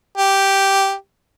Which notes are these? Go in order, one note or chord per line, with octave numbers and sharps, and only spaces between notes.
G4